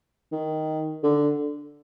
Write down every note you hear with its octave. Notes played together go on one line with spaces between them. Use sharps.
D#3
D3